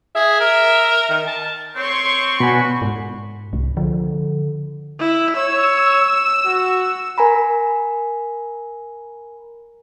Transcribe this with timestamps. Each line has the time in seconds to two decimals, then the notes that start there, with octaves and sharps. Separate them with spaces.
0.15 G#4 E5
0.40 A#4
1.09 D#3
1.27 A5
1.76 C4 C#5 C6 C#6
2.40 B2 D4 F#4 G#5 B5
2.82 G#2
3.53 C2
3.77 D3 F3
5.00 E4
5.37 C#5 E6
6.46 F#4
7.18 A#4 G#5 A#5 B5